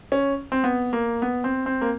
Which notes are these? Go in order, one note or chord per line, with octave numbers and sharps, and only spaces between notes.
C#4
C4
B3
A#3
B3
C4
C4
A#3